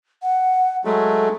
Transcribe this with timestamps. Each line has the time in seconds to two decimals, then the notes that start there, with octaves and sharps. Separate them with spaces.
0.22 F#5
0.85 F#3 G#3 A3 A4